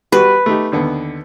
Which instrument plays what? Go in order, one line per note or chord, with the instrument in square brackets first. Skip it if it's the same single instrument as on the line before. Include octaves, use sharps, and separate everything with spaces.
[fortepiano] G3 F#4 [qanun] B4
[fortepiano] A3 D#4 G4
D#2 D3 B3